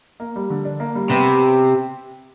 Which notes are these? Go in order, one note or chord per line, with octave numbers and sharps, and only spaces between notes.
A#3
G3
D3
D4
A#3
G3
C3 B3